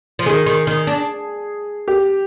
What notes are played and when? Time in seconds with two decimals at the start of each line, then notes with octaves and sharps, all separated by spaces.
0.19 F3
0.26 D#3 G#4
0.46 D#3
0.67 D#3
0.87 D4
1.88 G4